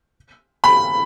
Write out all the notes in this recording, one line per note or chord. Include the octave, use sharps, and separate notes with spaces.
B5